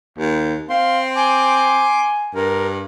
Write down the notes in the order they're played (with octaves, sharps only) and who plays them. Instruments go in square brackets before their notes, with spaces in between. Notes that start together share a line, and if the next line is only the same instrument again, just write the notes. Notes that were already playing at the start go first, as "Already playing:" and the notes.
[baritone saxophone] D#2
[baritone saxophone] C4 [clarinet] F5 [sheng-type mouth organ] C6
[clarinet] G#5 [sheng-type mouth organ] C6 D6
[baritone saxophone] G2 [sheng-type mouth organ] A#4